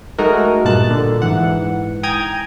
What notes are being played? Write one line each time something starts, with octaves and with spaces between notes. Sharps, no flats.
G#3 A3 D#4 F#4 A#4
G2 A#2 A5 F#6
A#2 D3
G#2 E3 F#5
G5 G#5 A#5 D#6 G#6